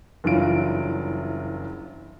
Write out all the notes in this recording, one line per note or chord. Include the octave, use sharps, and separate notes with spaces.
F#1 G2 E3 F#3 F4 D7